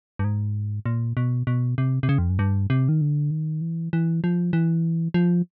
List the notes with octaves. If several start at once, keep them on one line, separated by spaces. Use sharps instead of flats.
G2
G#2
A#2
B2
B2
C3
C3
C#3
F2
F#2
G2
C3
D#3
D3
D#3
E3
E3
F3
E3
F3